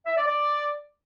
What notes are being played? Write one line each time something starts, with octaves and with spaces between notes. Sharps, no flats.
E5
D5
D5